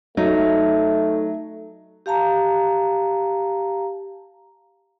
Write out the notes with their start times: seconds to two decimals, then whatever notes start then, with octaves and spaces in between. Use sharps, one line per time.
0.17 F#3 A3 D#4
2.06 G4 F5 A5 A#5